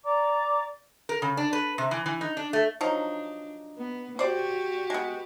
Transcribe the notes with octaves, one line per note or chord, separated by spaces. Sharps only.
D5 A#5 D6
A#4
C#3
D4
B4
C3
E3
E3
D#4
D4
A3
F3 F#3 D4 D#4
B3
F#4 G4 C5 D5
G#3 B3